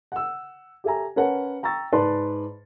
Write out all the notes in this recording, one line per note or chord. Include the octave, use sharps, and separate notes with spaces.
F#5 E6
G4 A4 E5 G#5 A#5
C#4 A#4 B4 F#5 A5
G5 A#5 C#6 E6 A6
G#2 B4 D5 A5 C6